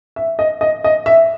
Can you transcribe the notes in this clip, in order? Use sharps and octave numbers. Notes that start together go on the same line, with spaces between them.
E5
D#5
D#5
D#5
E5